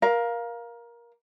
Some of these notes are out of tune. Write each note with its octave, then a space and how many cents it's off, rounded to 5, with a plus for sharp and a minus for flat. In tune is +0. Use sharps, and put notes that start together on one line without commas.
A#4 +20 F5 +0